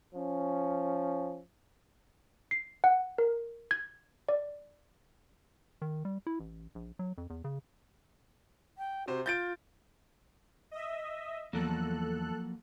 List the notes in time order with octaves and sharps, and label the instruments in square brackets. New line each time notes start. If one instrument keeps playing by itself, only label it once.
[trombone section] F3 C#4
[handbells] C7
F#5
A#4
G#6
D5
[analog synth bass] D#3
G3
E4
A1
A#1
F#3
F2
E2
C#3
[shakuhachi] G5
[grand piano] C3 C5 [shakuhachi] F#4
[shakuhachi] F4 [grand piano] G6 A6 D7
[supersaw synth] D#5 E5
[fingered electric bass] E2 [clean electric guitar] F3 F#3 A#3 [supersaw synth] A4 F#6